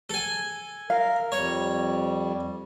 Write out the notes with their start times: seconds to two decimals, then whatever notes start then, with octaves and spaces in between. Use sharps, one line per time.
0.10 A4 G#5
0.90 A#4 F5
1.32 F2 G3 C#5